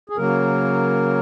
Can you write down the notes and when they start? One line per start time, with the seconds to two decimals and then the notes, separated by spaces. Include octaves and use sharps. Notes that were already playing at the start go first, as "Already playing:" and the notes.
0.10 G#4
0.17 C#3 F#3 A#3 A#4